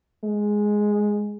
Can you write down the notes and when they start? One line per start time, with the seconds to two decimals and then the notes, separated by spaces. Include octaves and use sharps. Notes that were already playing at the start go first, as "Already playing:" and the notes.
0.24 G#3